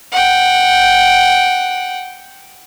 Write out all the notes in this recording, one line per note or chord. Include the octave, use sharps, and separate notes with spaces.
F#5 G5